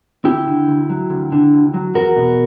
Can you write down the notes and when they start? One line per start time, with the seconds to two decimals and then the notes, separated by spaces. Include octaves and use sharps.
0.25 D2 E4 G4
0.47 D3
0.68 D2
0.90 F#3
1.10 D2
1.32 D3
1.53 D2
1.74 F#3
1.95 E2 F#4 A#4
2.16 B2